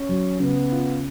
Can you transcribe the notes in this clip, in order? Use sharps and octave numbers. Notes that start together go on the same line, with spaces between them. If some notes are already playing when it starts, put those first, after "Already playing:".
Already playing: C#4
F#3
C#3 B3
F4